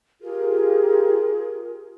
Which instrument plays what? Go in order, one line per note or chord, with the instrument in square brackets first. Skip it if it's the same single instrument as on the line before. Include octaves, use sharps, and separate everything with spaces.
[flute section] F4 G4 G#4 A#4